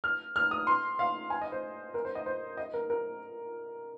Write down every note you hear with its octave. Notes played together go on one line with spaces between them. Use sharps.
F6
F6
D#6
C6
F5
G#5
D#5
C5
A#4
C5
D#5
C5
D#5
A#4
A#4